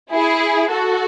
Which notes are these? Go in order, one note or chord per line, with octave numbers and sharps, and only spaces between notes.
E4 G#4
F#4 A4